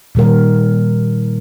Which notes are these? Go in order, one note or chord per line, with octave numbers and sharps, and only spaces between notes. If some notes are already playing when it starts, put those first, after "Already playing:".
A#2 D#3 G3 A#4